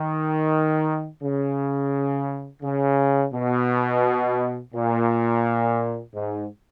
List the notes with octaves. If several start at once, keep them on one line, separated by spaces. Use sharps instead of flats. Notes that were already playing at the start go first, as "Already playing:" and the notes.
Already playing: D#3
C#3
C#3
B2
A#2
G#2